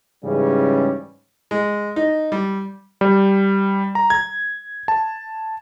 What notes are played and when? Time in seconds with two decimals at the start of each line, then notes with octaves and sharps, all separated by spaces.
0.24 G#2 C#3 E3 G3 C#4
1.51 G#3
1.96 D#4
2.32 G3
3.01 G3
3.95 A#5
4.10 G#6
4.88 A5